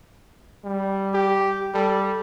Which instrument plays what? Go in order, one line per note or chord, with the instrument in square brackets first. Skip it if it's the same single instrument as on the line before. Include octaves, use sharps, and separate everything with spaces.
[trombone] G3
[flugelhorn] G4
[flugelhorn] G3 [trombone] A4